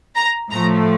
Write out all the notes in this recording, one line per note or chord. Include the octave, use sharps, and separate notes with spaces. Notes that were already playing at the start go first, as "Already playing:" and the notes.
A#5
A2 F3 A3 A#5